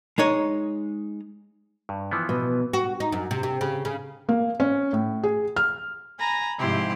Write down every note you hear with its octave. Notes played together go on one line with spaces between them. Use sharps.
G#3 D#4 C#5 D#5
G2
E3 F3 B3
B2
F#4
D#4
F#2
C3
C3
C#3
C#3
A#3
C#4
A2
G#4
F6
G#5 A#5 B5 A#6
G#2 C3 F3 E4 G4 C6